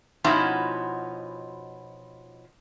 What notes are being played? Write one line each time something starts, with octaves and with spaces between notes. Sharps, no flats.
B2 F3 C#4 D#4 E4 F#4